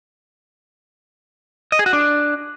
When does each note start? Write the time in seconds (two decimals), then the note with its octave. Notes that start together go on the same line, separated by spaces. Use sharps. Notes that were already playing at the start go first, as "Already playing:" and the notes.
1.72 D#5
1.79 G#4
1.86 F#4
1.93 D4